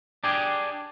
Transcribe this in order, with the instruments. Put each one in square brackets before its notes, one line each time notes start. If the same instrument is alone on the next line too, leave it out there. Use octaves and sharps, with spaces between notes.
[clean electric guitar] D4 G4 G#4